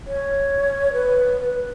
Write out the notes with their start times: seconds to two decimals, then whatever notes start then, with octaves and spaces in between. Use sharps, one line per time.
0.07 C#5
0.93 B4
1.50 B4